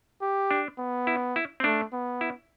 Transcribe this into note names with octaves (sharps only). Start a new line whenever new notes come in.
G4
D4
B3
E4
E4
C4
A3 D4
B3
E4